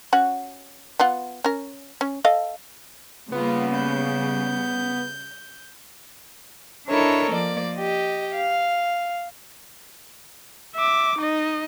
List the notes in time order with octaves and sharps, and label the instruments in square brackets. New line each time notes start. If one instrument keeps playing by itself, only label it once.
[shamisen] C#4 F#4 F#5
B3 F4 F#5
C#4 A#4
C#4
A4 D#5 F5
[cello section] C#3 G3 [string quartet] A#3 F4 [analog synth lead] B3
[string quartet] G6
D4 E4 A4 A#4 C#5 D#5
F3 A#3 D5
G4 D#5
F5
[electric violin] E5 D6
D#4 D#5